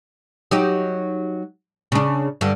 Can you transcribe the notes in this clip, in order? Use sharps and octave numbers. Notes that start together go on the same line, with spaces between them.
F#3 D#4 G4
C#3 D4
G2 D3